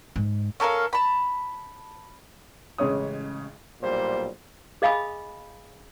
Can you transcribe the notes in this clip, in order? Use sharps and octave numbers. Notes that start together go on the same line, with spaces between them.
G#2
C#4 A4 A#4 F5
A5 B5
A1 C#3 G#3 C#5 D#6
B1 A#2 G3 C5
G#4 D#5 F5 G#5 B5 D#6